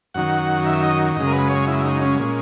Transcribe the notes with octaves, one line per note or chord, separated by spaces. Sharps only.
F#2 D#3 F#3 F#5
E5
D#5
F#2 C#3 G#3 D#5
A#4
B4
C#5
E4
D#4
C#4
A#2 G#3